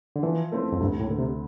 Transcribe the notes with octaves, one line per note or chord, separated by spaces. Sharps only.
D3
E3 F3
A3 C4 E4
F2
D2 G2
A2
D3 A3
C3